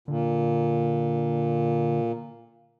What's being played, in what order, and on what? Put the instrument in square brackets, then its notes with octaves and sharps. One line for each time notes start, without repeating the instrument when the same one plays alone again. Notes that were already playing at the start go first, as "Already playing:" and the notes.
[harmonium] A#2 [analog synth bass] D3